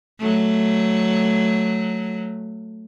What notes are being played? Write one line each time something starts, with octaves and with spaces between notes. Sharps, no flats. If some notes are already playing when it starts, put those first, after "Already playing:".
F#3 A3